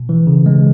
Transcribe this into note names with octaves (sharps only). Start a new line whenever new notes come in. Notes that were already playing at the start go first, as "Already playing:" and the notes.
Already playing: B2
E3
C#3
G#3